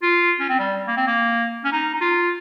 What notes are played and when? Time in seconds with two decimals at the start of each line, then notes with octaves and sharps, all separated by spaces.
0.02 F4
0.40 C#4
0.49 C4
0.59 G3
0.87 A#3
0.97 C4
1.07 A#3
1.64 C#4
1.72 D#4
1.94 D#4
2.01 F4